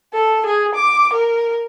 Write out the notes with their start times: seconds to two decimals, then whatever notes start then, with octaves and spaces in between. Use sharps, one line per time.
0.13 A4
0.46 G#4
0.75 D6
1.13 A#4